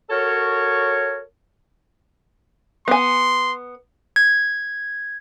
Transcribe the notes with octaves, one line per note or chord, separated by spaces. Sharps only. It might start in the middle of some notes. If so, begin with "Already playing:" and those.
F#4 A4 A#4 C#5
B3 G#5 C6
G#6